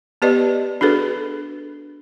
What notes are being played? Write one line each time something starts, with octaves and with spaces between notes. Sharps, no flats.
B3 G4 B4 D5 D#5
D4 F#4 G#4 A4 B4